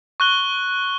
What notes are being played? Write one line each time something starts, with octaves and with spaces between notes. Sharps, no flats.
C#6 F#6 G7